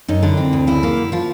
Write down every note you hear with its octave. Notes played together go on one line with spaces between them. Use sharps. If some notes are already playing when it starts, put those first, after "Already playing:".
F#2 D#4
D3 E4
C4
D2
C#3 E4
A#3
F#2
F3 F4